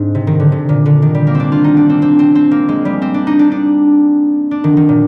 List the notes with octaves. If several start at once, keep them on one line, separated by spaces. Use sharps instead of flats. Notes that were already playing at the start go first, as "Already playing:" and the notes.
Already playing: G#2 C4 D4
C3
D#3
D3
C3
A#2
D3
D#3
G3
A#3
C4
D4
F4
D#4
D4
C4
C4
C4
C4
A#3
G#3
G3
C4
D4
D#4
D4
D4
D4
D#3
D#3
A#2